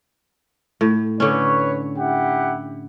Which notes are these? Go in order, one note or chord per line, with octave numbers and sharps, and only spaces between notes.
A2
D3 C#4 B4 C#5
E4 G4 F#5